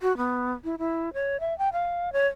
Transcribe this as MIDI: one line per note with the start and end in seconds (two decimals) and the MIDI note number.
0.01 0.15 66
0.17 0.52 59
0.64 0.76 64
0.79 1.13 64
1.14 1.40 73
1.40 1.57 76
1.58 1.69 79
1.73 2.13 77
2.13 2.27 73